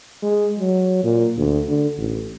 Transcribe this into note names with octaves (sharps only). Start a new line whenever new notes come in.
G#3
F#3
A#2
D2
D3
A1